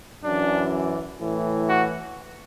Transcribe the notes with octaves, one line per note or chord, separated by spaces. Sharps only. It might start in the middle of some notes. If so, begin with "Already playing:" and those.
F#2 E3 D4
A2 E3
F#4